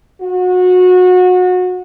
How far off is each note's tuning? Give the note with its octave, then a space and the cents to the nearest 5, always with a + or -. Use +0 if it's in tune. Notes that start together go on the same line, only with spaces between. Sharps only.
F#4 -25